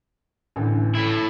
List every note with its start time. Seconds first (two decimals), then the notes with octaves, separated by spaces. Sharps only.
0.56 A1 D3 E3
0.95 A2 E4